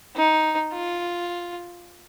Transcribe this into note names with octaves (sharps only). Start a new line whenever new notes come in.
D#4
F4